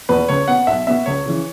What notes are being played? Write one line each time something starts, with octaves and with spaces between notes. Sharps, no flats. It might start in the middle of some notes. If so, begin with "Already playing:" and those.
E2 B2 B3 B4
C#2 C#5
B2 B3 F#5
B1 E5
B2 B3 E5
C#2 C#5
C#3 E3